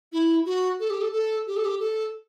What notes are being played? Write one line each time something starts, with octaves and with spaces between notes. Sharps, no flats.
E4
F#4
A4
G4
A4
A4
G4
A4
G4
A4